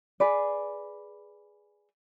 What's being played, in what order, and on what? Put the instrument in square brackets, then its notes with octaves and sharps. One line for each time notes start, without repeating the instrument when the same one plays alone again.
[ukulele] G#4 B4 D5